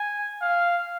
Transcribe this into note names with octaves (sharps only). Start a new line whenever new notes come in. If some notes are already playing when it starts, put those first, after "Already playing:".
Already playing: G#5
F5